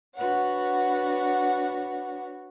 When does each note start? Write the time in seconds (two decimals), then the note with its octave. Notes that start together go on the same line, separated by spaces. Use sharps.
0.15 D4 F#4 B4 C#5 F#5